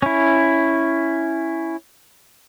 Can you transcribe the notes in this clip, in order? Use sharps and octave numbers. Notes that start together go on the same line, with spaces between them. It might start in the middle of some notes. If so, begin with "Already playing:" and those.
C#4 E4